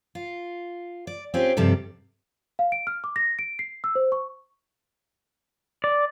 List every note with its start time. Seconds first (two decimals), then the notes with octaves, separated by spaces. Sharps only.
0.15 F4
1.07 D5
1.34 C4 C#4 F4 G4 G#4
1.57 G2 C3 F3 G3 A4
2.59 F5
2.72 D7
2.87 F6
3.04 D6
3.16 A#6
3.39 D7
3.59 C7
3.84 E6
3.95 C5
4.12 C#6
5.84 D5